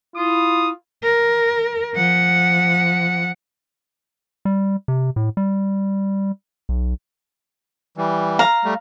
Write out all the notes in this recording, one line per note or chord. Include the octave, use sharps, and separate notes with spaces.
E4 F4 D#6
A#4
F3 F#5
G3
C3
A2
G3
B1
E3 G3
F5 A#5
G3 A3